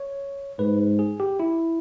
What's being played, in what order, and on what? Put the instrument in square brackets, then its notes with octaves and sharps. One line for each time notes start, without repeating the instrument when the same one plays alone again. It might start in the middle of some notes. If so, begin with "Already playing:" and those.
Already playing: [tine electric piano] C#5
[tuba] G#2 [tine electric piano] B4
[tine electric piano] G#4
G4
E4